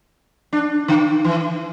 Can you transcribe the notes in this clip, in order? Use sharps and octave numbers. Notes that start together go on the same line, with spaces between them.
D4
D3
E3